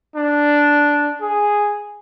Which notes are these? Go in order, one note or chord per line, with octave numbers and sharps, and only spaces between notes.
D4
G#4